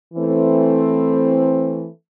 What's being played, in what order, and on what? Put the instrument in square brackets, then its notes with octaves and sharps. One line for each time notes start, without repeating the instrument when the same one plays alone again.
[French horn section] E3 A3 C4